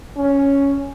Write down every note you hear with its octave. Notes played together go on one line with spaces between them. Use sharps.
C#4